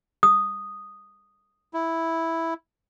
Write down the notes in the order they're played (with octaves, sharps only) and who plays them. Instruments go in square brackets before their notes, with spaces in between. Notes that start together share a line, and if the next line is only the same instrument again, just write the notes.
[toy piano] D#6
[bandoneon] E4